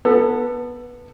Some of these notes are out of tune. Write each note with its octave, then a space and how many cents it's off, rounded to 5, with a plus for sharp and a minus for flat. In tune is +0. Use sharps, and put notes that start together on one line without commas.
B3 -15 A4 +10